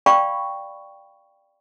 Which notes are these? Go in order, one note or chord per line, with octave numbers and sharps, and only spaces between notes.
D5 F5 G5 B5 C#6